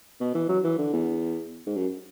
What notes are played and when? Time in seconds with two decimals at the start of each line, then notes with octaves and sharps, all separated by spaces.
0.20 B2
0.35 E3
0.49 F#3
0.64 E3
0.78 D3
0.93 E2
1.66 G#2
1.77 F#2